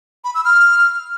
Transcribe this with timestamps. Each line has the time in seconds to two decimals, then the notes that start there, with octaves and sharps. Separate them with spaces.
0.24 B5
0.35 E6
0.45 F6